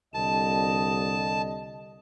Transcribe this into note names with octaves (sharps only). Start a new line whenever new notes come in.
C2 D3 D#5 A5